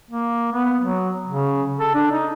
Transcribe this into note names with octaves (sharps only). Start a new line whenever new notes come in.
A#3
B3
F#3
C#3
A4
D4
D#4